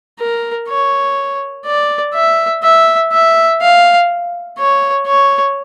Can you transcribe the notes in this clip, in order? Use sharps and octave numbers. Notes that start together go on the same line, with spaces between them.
A#4
C#5
D5
E5
E5
E5
F5
C#5
C#5